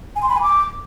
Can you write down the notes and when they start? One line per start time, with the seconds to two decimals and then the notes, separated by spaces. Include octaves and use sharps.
0.16 G#5
0.22 C6
0.29 B5
0.35 G#5
0.42 D6